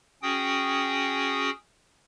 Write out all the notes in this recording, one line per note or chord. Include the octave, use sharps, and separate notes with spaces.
C#4 F#4 G#4 G5 D#6